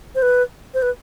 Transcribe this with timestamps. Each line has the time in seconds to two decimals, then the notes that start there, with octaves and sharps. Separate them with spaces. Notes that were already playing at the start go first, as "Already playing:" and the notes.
0.15 C5
0.22 B4
0.74 C5
0.82 B4